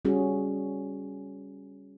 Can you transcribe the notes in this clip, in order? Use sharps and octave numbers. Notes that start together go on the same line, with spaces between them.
G3 C#4 F#4 G#4